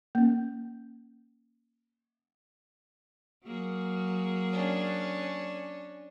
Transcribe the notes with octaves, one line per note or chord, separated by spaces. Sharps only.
A#3 C#4
F#3 A#3 G#4
C#4 D4